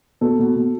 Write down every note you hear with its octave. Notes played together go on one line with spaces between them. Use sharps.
B2 A4
B2
B2